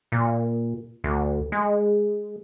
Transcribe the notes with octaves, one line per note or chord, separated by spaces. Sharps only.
A#2
D2
G#3